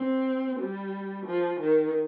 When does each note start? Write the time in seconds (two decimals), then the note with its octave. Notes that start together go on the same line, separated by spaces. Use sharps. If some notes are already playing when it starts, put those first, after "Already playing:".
Already playing: C4
0.59 G3
1.26 F3
1.60 D#3